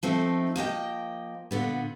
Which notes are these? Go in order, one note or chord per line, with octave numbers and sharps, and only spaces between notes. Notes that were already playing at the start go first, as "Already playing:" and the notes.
F3 A3 C4 D#4
F3 A#3 D#5 G5
A#2 D3 B3